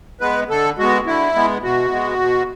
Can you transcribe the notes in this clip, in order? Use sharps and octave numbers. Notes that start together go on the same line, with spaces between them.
G#3 B3 B4
D3 A4
G#3 B3 F#4
D3 E4
G#3 B3
B2 F#4
G#3 B3
B2